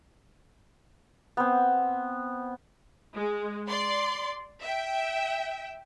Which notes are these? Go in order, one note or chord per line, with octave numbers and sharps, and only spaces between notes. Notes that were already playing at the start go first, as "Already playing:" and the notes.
B3 C4
G#3
D5 C6
E5 G5